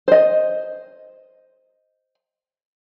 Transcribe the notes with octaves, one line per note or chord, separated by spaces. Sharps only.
C5 D#5